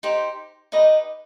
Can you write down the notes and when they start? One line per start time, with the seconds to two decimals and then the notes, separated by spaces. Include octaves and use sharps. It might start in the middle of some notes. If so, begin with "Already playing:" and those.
0.03 D#4 G4 C5
0.72 D#4 G4 B4 D#5